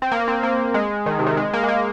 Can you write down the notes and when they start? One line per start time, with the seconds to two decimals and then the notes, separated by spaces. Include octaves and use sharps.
0.02 C4
0.12 A#3
0.28 C4
0.43 A#3
0.74 G#3
1.06 D#3
1.19 C3
1.26 D#3
1.37 G#3
1.53 A#3
1.64 G#3
1.68 A#3